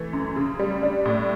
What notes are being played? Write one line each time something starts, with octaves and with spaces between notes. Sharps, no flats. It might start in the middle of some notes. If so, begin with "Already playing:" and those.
Already playing: E3 A3
F#2
C#3
G3
D4
A2